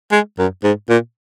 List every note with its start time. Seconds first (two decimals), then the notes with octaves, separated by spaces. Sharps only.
0.12 G#3
0.39 F#2
0.64 G#2
0.89 A#2